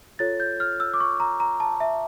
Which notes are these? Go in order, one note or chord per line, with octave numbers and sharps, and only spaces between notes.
F4 A4 C#5 A6
G6
F6
E6
D6
C#6
A#5
A#5
A5
E5